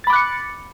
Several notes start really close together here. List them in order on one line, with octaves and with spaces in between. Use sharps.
A6 B5 D6 F#6 C#7